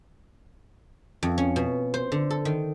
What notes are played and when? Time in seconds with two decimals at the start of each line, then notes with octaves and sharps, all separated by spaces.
1.23 F2
1.38 C#4
1.56 B2
1.94 C5
2.12 D3
2.31 A4
2.45 D#3